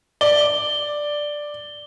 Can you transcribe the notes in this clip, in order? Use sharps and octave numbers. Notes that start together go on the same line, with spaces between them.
D5 G7